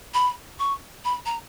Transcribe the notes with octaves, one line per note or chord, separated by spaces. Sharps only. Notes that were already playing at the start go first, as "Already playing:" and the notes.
B5
C#6
B5
A#5